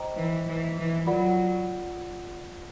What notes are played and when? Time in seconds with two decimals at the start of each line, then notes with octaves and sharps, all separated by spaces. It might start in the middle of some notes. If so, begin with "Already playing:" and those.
Already playing: C5 D#5 G5 A#5 D6
0.17 E3
0.46 E3
0.77 E3
1.07 F#3 F4 A#4 D5 F#5 B5